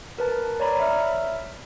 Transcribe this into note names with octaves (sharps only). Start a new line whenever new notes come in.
A#4 B4 A5
C#5 D5 A#5 B5
E5 F6